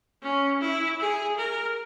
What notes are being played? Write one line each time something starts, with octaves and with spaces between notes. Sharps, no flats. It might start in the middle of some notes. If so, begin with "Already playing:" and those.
C#4
E4
G#4
A#4